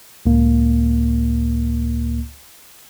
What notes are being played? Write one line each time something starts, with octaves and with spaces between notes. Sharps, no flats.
C#2 A2 A#3